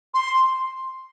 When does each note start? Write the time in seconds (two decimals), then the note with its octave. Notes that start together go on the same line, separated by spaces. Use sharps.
0.14 C6